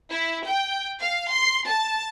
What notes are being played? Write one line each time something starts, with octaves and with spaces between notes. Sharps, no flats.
E4
G5
F5
C6
A5